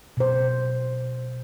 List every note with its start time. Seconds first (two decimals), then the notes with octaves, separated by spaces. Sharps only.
0.17 B2 C5